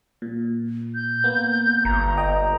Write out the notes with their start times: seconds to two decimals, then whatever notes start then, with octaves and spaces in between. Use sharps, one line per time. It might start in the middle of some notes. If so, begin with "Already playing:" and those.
0.22 A#2
0.95 G6
1.24 A#3 B3
1.85 G1 A#5
2.17 D#5 G5